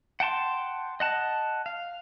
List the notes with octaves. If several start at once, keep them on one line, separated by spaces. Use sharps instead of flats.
F#5 G5 A5 C6
D#5 F#5 A5
F5